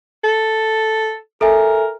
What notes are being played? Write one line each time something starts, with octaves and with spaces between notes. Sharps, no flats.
A4
A4 A#4 E5 G#5